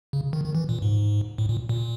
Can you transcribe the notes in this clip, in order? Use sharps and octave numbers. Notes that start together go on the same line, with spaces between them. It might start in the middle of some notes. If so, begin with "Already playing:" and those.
C#3
D#3
D#3
E3
A#2
G#2
A2
A#2
A#2